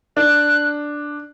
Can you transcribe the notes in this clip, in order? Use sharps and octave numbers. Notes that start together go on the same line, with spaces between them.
D4 F#6